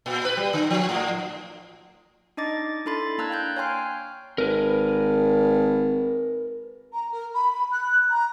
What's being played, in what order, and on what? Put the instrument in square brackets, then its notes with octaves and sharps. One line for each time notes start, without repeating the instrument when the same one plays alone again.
[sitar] A#2
B4
G3
D3
F3
A2
[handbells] D4 D#4 D#5 D6 A6
D4 E4 A4 B5 C6 A6
A#3 D4 A#5 E6 F#6 G#6
F5 G5 F#6 G6
C#5 G5 G#5 C6 F6
[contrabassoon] G#1 [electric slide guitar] A#4 B4
[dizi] A#5
A#4
B5
F#6
A#5